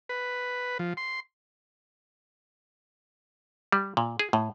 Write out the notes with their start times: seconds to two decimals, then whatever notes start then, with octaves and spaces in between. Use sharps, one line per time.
0.09 B4
0.79 F3
0.97 C6
3.72 G3
3.97 A#2
4.19 G#4
4.33 A2